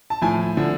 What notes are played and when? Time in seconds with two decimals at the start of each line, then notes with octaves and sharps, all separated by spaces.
0.10 A5
0.22 A2 F3 G#5
0.57 D3 F3